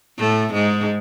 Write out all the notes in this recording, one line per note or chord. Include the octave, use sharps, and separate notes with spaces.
A2 A3
G#2 G#3